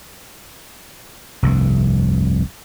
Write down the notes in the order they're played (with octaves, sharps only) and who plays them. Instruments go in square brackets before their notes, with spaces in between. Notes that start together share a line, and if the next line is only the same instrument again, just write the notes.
[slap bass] F1 C2 G2